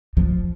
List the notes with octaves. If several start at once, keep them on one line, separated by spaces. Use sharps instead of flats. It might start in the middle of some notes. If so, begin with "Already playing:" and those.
F3